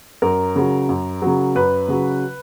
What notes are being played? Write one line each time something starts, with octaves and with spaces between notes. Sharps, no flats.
F#2 A#4
C#3 F#3
F#2
C#3 F#3
F#2 B4
C#3 F#3